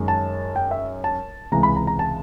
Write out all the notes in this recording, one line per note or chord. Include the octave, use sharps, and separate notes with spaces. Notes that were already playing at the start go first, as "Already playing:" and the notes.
Already playing: F#2 D#3 G#3
A5
G5
E5
A5
C#2 C3 E3 G#3 A#5
B5
A#5
A#5
A5